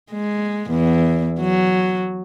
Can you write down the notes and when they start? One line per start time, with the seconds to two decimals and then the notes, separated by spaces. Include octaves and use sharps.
0.12 G#3
0.71 E2
1.41 F#3